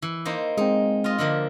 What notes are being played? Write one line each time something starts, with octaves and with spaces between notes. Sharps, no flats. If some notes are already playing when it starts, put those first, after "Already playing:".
E3
A#3 D#4 C5
G#3 C4 D#4
F4 D#5
D3 F3 A#3